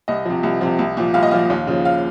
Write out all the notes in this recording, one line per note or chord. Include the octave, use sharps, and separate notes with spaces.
C2 D#5
C3 F3
C2
C3 F3
C2
A#2 F3
C2 F5
D#5
A#2 F3 F5
D#2
C#3 F3
F5